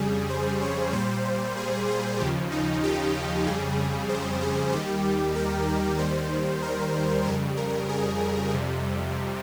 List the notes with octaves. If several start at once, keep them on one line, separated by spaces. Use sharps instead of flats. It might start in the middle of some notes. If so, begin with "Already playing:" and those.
Already playing: F2 C#3 G3 G#4
C5
C#5
A#2 G3 C5
G#4
G#4
D#2 C#3 F3 G4
D#4
G4
F2 C#3 G3 G#4
C5
G#4
D#2 D#3 G3 G4
A#4
D#2 D#3 G3 C5
A#4
F2 C#3 G3 A#4
A#4
G#4
F2 C3 G3